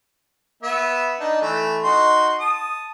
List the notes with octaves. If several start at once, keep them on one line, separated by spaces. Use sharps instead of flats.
B3 E5
D4 D#4
E3 A3
D#4 F#4 C6
A5 D#6